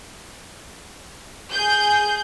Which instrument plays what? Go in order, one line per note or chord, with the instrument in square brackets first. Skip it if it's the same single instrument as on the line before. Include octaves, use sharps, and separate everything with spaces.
[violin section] G#4 G6